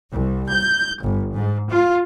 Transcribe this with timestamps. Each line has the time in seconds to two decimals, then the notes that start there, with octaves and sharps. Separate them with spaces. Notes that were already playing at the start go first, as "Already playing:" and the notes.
0.12 C2
0.51 G6
1.02 G1
1.34 G#2
1.69 F4